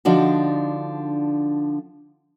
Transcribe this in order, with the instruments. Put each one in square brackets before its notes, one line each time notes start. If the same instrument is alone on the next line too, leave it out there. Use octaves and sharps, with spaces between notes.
[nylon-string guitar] D3 F3 D4 D#4 F#4